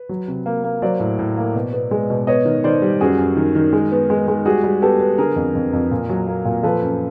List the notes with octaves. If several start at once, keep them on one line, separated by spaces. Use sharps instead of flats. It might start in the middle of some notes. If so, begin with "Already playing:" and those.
Already playing: B4
F#3
C3
A#3
A#3
F#3 C5 D5
A2
A2
A#3
B2
B3
G#3
B2
B3 C#5 D#5
D#3
D#3 C5 D5
G3
F#2 F#4 G#4
F#2
D#3
D#3
G#3
B3
G#3
G#3
G3 F#4 G#4
G3
B3 G4 A4
B3
D3 G#4 A#4
F2
F2
F2
A#2
F#3
A#3
A#2
F3 A4 B4
F#2